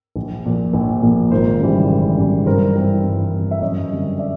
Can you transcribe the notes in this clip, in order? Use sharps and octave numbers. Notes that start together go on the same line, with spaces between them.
A#1
A#2 F3 A#3
A#1
A#2 F3 A#3
G#1 A#4 C5
F#2 C#3 E3 G3
G#1
F#2 C#3 E3 G3
G2 A#4 C5
E3 G3 C4
G2
E3 G3 C4
E5
F#2 C#5 D#5
D3 G3 C4
D5 E5